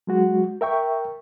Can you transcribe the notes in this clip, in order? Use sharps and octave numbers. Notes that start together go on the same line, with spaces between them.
F#3 G#3 F#4
A#4 E5 G5 C#6